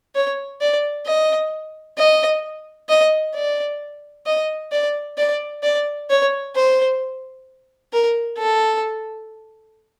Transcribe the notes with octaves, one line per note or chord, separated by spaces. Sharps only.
C#5
D5
D#5
D#5
D#5
D5
D#5
D5
D5
D5
C#5
C5
A#4
A4